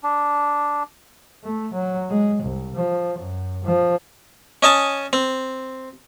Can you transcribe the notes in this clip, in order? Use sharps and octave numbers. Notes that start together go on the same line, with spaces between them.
D4
A3
F#3
G#3
C2
F3
F#2
F3
C#4 D#5 G#5 A5
C4